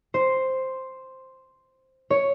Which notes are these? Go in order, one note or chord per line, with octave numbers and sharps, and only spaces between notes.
C5
C#5